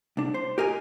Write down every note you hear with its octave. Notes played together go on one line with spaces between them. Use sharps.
C2 D4
C5
G4 A#4 D#5 G#5